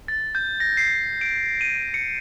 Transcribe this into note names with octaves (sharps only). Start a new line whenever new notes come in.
A6
G6
A#6
C7
D7
D#7
C#7